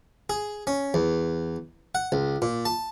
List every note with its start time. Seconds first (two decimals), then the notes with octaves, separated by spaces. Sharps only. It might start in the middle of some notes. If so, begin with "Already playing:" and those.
0.30 G#4
0.67 C#4
0.94 E2
1.95 F#5
2.12 C#2
2.42 A#2
2.65 A5